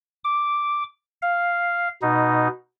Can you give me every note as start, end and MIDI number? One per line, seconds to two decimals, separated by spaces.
0.24 0.83 86
1.22 1.88 77
2.02 2.48 47
2.02 2.48 63